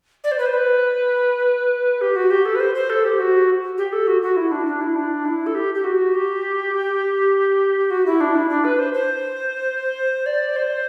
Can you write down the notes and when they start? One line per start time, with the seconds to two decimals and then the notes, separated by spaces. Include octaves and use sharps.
0.24 D5
0.31 C5
0.39 B4
0.46 C5
0.53 B4
2.01 G4
2.16 F#4
2.31 G4
2.45 A4
2.55 B4
2.60 C5
2.75 C5
2.90 A4
3.04 G4
3.19 F#4
3.78 G4
3.92 A4
4.07 F#4
4.22 F#4
4.37 E4
4.51 D4
4.66 D4
4.81 E4
4.96 D4
5.25 E4
5.46 A4
5.55 G4
5.74 G4
5.84 F#4
6.14 G4
7.91 F#4
8.06 E4
8.20 D4
8.35 E4
8.49 D4
8.64 B4
8.79 C5
8.94 C5
10.26 D5
10.56 C5